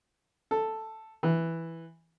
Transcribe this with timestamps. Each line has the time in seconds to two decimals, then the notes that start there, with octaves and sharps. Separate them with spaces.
0.51 A4
1.23 E3